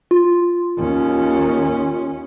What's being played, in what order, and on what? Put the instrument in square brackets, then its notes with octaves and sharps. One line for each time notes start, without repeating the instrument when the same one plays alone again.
[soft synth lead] F4
[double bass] D#2 C#4